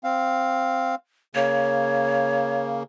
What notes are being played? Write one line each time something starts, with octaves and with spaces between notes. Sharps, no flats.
C4 F5
C#3 A#3 C#5